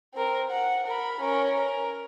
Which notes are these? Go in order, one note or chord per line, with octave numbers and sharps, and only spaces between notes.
C4 A#4
F#5
A#4 B5
C#4 A#4
A#4